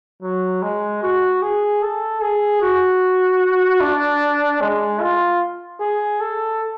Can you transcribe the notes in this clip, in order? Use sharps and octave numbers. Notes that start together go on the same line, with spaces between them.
F#3
G#3
F#4
G#4
A4
G#4
F#4
D4
G#3
F4
G#4
A4